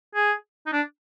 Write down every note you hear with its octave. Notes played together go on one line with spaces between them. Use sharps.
G#4
D#4
D4